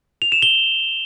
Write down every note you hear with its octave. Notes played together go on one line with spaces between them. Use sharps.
F7
E7
G7